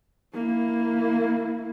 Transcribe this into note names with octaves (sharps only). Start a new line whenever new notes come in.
A#3 E4